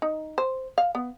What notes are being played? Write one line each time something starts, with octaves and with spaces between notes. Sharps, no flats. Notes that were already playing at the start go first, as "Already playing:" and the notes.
D#4
C5
F5
B3